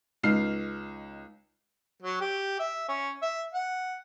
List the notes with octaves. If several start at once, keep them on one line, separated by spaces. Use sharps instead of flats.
C#2 D#4 F6 C7
F#3
G4
E5
C#4
E5
F#5